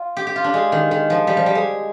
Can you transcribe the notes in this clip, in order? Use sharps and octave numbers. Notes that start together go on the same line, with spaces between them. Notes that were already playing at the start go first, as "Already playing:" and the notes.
Already playing: F4
G4
G4
F4
D4
G#3
D#3
D#3
F3
G3
F3
G3
G#3